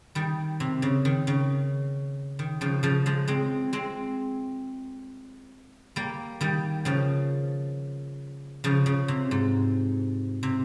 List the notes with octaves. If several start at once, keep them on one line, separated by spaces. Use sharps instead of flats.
D#3 G3
C3
C#3
D#3
C#3
D#3
C#3 F3
C#3 F3
F3 G#3
G#3 C4
G#3 C4
G3 A#3
D#3 G3
C#3 F3
C#3 F3
C#3
C3
G#2
C3